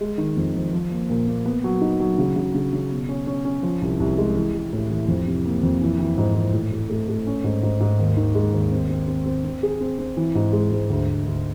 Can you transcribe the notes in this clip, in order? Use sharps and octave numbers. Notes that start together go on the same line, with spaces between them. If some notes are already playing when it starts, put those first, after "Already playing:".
G#3
D#3
F2
F2
F3
A#3
A#2
A#3
B3
F#3
D#4
F#3
C#3
C#3
C#3
C#3
B2
C#4
C#4
C#4
F3
C2
C2
G#3
E3
G#3
A2
E3
F2
C3
A#3
F2
E3
E3
G#2
E3
A2
A2
A3
A3
C#4
G#2
G#2
G#2
D#2
D#3
G#3
D#2
C4
C4
C4
C4
C4
G#4
C4
C4
E3
G#2
G#3
G#2
D2
D2
D2